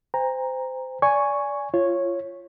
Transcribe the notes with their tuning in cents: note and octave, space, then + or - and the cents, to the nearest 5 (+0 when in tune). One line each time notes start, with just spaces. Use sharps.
C5 -25 G5 +45 A#5 +0
D5 -20 G#5 +0 C#6 +0
F4 -20 C#5 -10